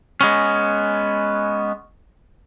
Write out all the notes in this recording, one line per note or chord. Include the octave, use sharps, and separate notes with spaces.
G#3 B3 C#4